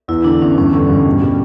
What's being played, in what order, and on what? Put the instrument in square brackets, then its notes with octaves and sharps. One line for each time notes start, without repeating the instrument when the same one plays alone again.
[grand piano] E2 [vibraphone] E4
[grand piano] D3 [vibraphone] D4
[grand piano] E2 [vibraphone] C#4
[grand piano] G2 [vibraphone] C#4
[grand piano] D3
G2
B2
G3